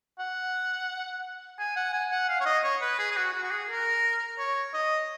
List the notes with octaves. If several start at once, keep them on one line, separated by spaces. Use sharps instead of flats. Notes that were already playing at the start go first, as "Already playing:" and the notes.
F#5
G#5
F#5
G#5
F#5
F5
C#5
D#5
C#5
B4
G#4
G#4
F#4
F#4
F#4
G#4
A#4
C#5
D#5